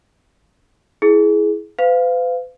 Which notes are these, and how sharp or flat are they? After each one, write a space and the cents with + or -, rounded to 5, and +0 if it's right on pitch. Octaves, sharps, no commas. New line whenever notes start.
E4 +0 G#4 +20
B4 +45 F5 +0